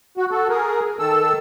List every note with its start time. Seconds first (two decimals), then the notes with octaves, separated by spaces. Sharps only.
0.17 F#4
0.31 F#4 A4
0.49 G#4 A#4
0.99 D#3 A4 E6